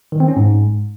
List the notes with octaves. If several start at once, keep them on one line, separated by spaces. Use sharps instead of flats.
D#3
C4
C#4
G#2